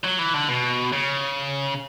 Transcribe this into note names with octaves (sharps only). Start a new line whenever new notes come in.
F#3
E3
D3
B2
C#3